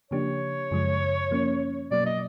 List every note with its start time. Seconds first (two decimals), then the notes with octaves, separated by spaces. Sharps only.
0.11 C#3 F3 A#3 D4 G4 C#5
0.71 F#2 C#3 F3 G#3
1.31 F3 A#3 C#4
1.91 B2 F#3 A#3 D5
2.06 D#5